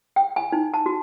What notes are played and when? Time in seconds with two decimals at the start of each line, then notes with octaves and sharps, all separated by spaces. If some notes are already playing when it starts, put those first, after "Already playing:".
0.16 G5
0.36 G#5
0.52 D#4
0.74 A5
0.86 F#4